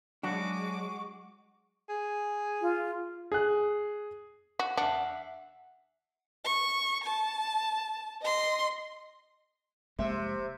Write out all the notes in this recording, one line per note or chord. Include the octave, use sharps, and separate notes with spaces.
F#3 G#3 D4 F#4 D6
G#4
F4
G#4 F#6
F#4
D4 E5 F#5
C#6
A5
D#5 C6
F1 C3 G#3 A#3 C5 E5